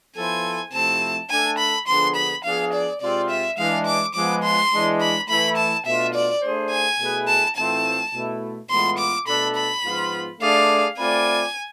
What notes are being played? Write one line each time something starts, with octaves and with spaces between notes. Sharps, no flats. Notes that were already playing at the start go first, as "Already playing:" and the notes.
F3 B3 E4 A4 C5 G#5
C3 F3 A3 C4 E4 A5
A3 D4 A4 G#5
B5
D3 F3 B3 D4 G#4 C6
B5
F3 B3 D4 G#4 F5
D5
C3 G#3 C4 F4 D5
E5
E3 G#3 D4 F5
D6
F3 G#3 B3 D6
C6
E3 G#3 D4
B5
E3 A3 E4 B5
A5
B2 A3 D4 F4 E5
D5
A3 D4 G#4 C5
G#5
B2 A3 E4 G#4 B4
A5
A2 E3 A3 C4 F4 A5
B2 A3 E4
A2 E3 G#3 B3 F4 C6
D6
B2 A3 D4 A4 B5
B5
G#2 F3 B3 F4
A3 D4 G#4 D5 F5
A3 C4 F4 B4 D5 G#5